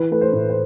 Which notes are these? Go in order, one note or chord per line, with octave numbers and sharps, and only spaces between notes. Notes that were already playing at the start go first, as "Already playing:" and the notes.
Already playing: E3 B4
A3 B4
C5
A2
C5